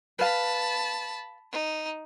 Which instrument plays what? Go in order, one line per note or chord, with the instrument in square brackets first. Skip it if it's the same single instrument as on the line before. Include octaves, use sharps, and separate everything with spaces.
[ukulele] B4 F5 [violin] A5 B5
[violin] D#4